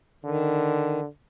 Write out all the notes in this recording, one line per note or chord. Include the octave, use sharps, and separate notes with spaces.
D3 D#3